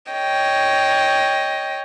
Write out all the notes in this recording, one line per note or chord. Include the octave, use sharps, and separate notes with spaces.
C#5 D#5 G5